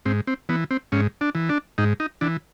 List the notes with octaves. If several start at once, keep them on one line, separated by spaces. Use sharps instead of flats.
G#2 C4
C4
E3 B3
C4
G#2 C#4
D4
E3
D4
G#2 D#4
D#4
E3 D4